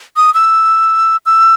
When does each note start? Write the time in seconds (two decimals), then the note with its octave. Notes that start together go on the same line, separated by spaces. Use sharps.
0.17 D#6
0.34 E6
1.26 E6